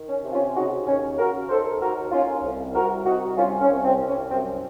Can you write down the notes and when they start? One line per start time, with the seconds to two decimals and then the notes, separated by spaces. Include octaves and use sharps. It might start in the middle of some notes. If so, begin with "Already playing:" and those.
Already playing: D#3
0.09 C#4
0.24 C3
0.33 C#4 F4
0.56 C#3 D#4 F#4
0.87 D#2 C#4
1.18 C#3 F#4 A#4
1.50 D#2 A4 C5
1.81 D#2 F#4 A#4
2.12 D#2 C#4 F4
2.44 C2
2.75 C2 F#4 A#4
3.06 C2 D#4 F#4
3.37 C2 C#4 F4
3.61 C#4
3.69 C2
3.85 C4
4.00 C2
4.08 C#4
4.31 F#2 C4